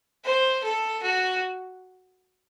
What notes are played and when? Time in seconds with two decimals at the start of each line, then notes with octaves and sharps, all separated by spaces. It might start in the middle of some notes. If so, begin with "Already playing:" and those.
0.24 C5
0.63 A4
1.03 F#4